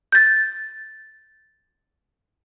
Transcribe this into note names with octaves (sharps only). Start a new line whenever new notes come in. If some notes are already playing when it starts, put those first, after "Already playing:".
G6 A6